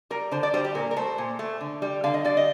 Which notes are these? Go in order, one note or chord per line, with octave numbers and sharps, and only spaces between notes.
G3 A#4
D3 C5
D5
G3 C5
G4
A#2 A#4
A#4
A3 C5
A#2
A3
D3
G3
D3 F5
D#5
G3 D5
D#5